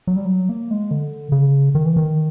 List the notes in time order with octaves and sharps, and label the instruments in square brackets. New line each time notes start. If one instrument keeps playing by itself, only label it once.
[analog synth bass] F#3
G3
F#3
A#3
G#3
D3
C#3
D#3
E3
D#3